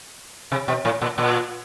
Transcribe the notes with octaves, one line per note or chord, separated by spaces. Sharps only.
C3
B2
A2
A#2
A#2